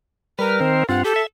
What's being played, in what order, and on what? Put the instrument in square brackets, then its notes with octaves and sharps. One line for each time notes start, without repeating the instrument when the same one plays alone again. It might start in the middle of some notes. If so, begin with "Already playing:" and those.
[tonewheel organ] G3 B4 F6 [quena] A#4
[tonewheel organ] D#3 C4 C5
[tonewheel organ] G2 C4 F4 [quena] F#5
[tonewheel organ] G4 [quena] A4
[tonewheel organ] E5